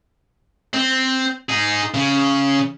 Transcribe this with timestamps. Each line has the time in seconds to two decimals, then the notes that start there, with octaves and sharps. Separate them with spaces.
0.74 C4
1.49 D#4 G#4
1.94 C#3